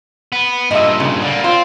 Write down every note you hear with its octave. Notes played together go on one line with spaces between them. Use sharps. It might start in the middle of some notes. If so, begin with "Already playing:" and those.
B3
G2 A#2 D#5 E5
C#3
D3 G3 A#3
C4 F4